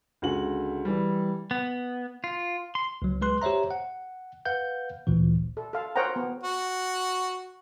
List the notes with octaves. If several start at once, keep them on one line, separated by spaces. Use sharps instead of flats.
C#2 D3 F#4 F#7
E3 G3
B3
F4
C6
C#2 F#3
G#3 B4 C6 F#6
G4 C5 C#5 E5 A#5
F#5
B4 F5 F#5 G6
G1 D2 A#2 E3
A4
A4 F5
A#4 C5 C#5 F#5 G5 A#5
B3
F#4